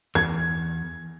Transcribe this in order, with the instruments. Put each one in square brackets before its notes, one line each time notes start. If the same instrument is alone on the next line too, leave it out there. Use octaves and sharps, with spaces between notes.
[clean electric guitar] E2 [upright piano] G#6